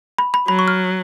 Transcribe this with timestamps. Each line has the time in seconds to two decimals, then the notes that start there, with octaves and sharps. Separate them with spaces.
0.18 B5
0.34 B5
0.48 F#3 B5
0.59 C#6
0.68 F6